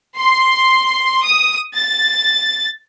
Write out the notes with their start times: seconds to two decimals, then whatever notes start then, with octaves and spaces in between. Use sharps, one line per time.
0.16 C6
1.24 D#6
1.74 A6